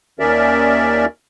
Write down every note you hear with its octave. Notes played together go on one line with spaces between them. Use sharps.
D#2 D#3 C#4 A#4 D5 E5